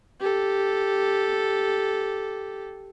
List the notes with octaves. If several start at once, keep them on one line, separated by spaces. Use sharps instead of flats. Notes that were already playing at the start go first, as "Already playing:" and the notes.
G4 A4